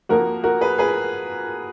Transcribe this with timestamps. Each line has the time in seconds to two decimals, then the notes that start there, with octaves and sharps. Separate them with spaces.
0.09 F2 F3 A#3 F#4 A#4
0.44 F#4 A#4
0.61 G#4 B4
0.78 G#4 B4